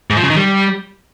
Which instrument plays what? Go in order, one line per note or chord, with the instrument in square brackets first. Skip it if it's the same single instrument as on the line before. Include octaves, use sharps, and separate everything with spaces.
[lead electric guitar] G#2
F3
C#3
D#3
G3